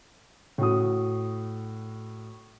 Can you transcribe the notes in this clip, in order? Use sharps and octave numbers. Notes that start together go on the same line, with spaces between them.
A2 F#4 D#6